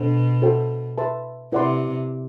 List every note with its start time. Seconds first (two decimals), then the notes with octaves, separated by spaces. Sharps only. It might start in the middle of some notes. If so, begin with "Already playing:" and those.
Already playing: B2 D4 A4 C5 F#5
0.42 F#4 A4 C5 G5
0.98 B4 E5 A5 C6
1.52 C3 E4 B4 D5 F#5 C6